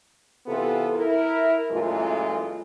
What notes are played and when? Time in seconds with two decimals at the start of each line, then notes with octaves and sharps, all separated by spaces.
0.47 C3 E3 B3 F4 A4
0.95 E4 A#4
1.71 F#2 A#2 E3 G#3 A3 F4